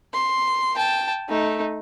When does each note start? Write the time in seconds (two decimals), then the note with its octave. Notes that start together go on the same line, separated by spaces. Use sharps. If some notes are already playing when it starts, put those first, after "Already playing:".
0.14 C6
0.75 G5 A5
1.29 A3 D#4